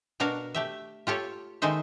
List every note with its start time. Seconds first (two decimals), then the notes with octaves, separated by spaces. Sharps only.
0.20 B2 D4 F#4 A#4 F5
0.55 A3 G4 E5
1.07 F4 G4 A4 C#5
1.62 D#3 G#3 D#4 A4 C5 E5